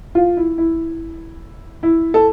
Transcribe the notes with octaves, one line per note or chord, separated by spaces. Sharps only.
F4
E4
E4
E4
A4